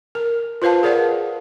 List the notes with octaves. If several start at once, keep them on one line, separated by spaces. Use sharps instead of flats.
A#4
F4 B4 C5 F5 A5
G#4 A#4 D5 F5 F#5